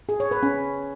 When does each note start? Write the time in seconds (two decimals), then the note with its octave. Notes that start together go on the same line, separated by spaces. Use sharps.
0.09 G#4
0.20 C#5
0.31 B4
0.43 C#4